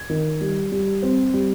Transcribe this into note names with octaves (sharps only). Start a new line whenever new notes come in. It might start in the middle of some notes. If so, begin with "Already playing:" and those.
Already playing: G#6
D#3
G3
G3
C4
G3